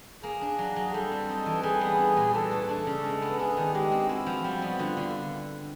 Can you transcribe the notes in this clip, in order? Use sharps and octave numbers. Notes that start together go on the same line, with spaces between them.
A#3 G#4
D4
F#3
F#3
G3 A4
C4
D#4
E3
G3 G#4
B3
D4
A#2
E3 A4
A3
D4 A4
C#3
G#3
B3
D4 G#4
D#3
G#3 G4
C4
E4 F#4
F3
G3
B3
D3 F4
D3